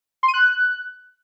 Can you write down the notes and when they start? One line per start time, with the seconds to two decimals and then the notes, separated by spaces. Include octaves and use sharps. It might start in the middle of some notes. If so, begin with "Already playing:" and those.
0.23 C6
0.28 D#7
0.34 F#6